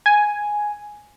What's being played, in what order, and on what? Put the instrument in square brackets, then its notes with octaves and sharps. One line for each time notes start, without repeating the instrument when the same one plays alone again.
[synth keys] G#5